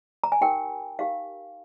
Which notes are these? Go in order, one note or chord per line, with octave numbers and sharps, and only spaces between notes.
A#5
G#5
D#4 G4 A#4 G5
D#4 G4 A#4 F5